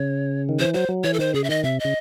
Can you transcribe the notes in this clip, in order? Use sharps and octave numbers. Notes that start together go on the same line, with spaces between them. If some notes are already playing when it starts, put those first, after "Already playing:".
Already playing: C#3 C#5
D#3
E3 C5
F#3 C5
F#3
E3 C#5
A4
D#3 C5
C#3 G#4
E5
D#3 D#5
C3 E5
D#5
C#3